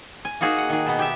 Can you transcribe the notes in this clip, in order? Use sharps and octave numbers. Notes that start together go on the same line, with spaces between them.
G#5
A#3 D#4 F#4 G#4
F#5
D#3 G#4
B2 B3
G4 E5